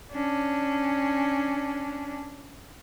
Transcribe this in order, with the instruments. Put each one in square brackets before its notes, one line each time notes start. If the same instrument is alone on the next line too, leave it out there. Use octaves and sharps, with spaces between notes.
[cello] C#4 D4